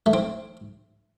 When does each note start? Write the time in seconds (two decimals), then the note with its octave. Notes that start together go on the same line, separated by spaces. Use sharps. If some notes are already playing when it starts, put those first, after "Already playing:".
0.06 A3
0.13 C4